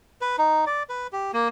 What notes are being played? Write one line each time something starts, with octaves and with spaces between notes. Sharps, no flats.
B4
D#4
D5
B4
G4
A#3